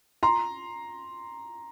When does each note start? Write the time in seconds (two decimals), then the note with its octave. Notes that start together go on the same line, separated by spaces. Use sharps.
0.23 A#5 C6